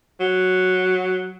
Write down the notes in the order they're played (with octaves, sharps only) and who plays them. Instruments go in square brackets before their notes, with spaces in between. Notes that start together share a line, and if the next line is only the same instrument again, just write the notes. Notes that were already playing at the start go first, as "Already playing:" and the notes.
[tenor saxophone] F#3